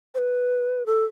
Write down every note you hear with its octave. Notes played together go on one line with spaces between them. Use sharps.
C5
B4
A4